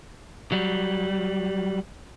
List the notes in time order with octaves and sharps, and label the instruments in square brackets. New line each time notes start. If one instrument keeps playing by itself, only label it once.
[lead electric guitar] F#3 G3